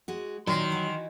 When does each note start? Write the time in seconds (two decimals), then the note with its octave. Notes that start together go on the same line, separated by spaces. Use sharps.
0.08 G#3 F#4
0.47 A#2 D#3 F#3 C6
0.70 E3 E4 F#4